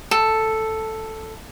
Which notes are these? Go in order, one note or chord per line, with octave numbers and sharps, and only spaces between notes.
A4